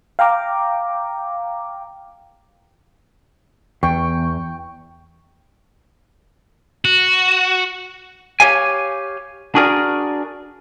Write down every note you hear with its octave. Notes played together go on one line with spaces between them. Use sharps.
F5 G5 A#5 D6
E2 G5 C#6
F#4
G4 C#5 F5 G#5
D4 F#4 G#4 A#4 D5